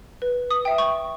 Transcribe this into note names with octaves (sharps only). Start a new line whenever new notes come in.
B4
D#6
E5 G5
C#6